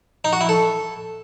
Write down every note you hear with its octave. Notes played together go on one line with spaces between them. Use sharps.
D#4
F#4
E4
A4